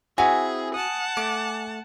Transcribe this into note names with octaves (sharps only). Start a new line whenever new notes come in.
C4 E4 F#4 G#4 E5 G#5
F#5 A5 D#6
A3 D6